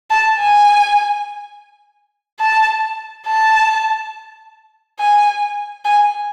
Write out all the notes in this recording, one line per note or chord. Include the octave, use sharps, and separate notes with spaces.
A5
G#5
A5
A5
G#5
G#5